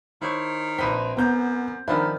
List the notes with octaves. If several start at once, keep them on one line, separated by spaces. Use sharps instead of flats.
D#3 E4 C5 C#5
A#1 C4 B4 D#5 B6
F#2 B3 A#5 G6
G#2 D#3 F3 D4 E5 B5